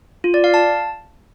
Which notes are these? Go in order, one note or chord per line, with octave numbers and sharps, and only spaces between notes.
F4
D5
F5
A5